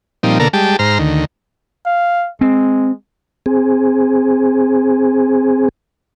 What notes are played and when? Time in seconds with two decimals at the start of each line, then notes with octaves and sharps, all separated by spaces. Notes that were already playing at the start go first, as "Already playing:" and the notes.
0.23 A#2 F3 G3 C4 D#4
0.39 B2 D3 A#3 A4 A#4
0.53 G3 G#3 G4 A5
0.79 G#2 C5 A#5 F6
0.99 D2 D#3
1.86 F5
2.41 G#3 C4
3.46 C4 G#4